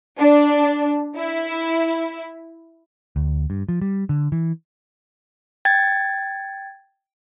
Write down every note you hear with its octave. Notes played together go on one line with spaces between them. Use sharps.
D4
E4
D2
G2
F3
G3
D3
E3
G5 G#6 A6